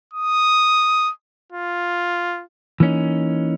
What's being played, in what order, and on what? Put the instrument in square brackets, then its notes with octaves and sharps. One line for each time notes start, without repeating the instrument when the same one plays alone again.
[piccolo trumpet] D#6
F4
[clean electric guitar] E3 A#3 C#4 D#4